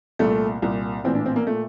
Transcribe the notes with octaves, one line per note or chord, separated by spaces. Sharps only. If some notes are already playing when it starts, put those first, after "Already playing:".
C2 A#2 A3
C2 A#2
A#1 A2 E3 C4
D4
C4
A#3
A#2 A3